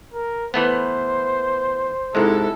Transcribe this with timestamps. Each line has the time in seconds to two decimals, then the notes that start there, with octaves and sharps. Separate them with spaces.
0.13 A#4
0.54 E3 A3 B3 C5
2.15 G#2 C3 G#3 E4 A4